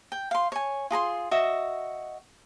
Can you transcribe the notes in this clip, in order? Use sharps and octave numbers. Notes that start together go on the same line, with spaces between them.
G5
F5 C6
C#5 G#5
F4 G#4 A#5 C6
F#4 D#5 E5